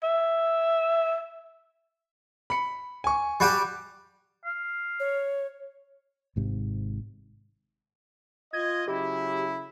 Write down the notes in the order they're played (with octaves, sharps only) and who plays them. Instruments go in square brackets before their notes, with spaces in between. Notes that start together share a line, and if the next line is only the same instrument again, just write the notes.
[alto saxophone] E5
[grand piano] B5 C#7
G#5 C#6
[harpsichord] G3 F#4 G4
[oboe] F5
[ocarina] C#5
[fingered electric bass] G#1 G#2 C3
[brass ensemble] F4 D#5 [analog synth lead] G#6
[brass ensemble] C#3 F#3 E4 [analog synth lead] G4